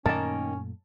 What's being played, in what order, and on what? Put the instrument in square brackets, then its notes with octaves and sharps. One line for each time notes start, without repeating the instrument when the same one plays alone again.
[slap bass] F#2 A#2 A3 [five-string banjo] D#3 A#3 [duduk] C#4 [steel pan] A5